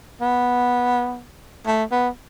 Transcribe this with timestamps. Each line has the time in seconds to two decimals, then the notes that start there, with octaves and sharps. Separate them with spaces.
0.21 B3
1.67 A3
1.92 B3